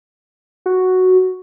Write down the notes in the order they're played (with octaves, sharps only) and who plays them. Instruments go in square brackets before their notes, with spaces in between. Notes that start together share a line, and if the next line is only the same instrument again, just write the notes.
[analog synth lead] F#4